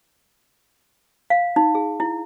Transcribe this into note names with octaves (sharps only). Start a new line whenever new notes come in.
F5
D#4
G#4
E4